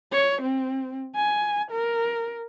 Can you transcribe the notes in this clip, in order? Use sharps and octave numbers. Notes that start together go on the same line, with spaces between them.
C#5
C4
G#5
A#4